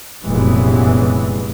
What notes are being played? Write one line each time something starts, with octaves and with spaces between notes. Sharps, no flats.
F1 F#2 A#2 E3 G#3 B3